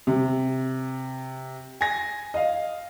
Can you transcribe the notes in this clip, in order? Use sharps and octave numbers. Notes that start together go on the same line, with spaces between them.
C3
G#5 A#6
D#5 F5